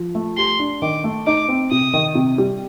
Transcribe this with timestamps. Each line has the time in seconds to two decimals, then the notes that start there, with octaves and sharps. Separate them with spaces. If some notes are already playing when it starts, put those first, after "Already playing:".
Already playing: F3
0.15 A3
0.37 G4 C6
0.59 D4
0.82 D#3 D6
1.04 A3
1.27 D#4 D6
1.49 C4
1.71 C3 D#6
1.93 D#3
2.15 C3
2.38 G3